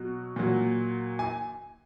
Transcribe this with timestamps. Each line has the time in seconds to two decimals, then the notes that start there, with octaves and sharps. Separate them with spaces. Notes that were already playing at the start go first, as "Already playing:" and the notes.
Already playing: B2 F#3
0.36 A#2 F#3
1.19 G#5